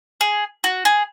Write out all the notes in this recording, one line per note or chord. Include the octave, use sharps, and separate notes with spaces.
G#4
F#4
G#4